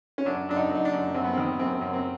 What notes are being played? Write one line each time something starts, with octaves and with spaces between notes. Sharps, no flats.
C#4
F#2 D4
F#2 D4
D#4
F#2
D#4
D4
F#2
F#2 C4
B3
D#3 C4
F#2 C4
F#2
C4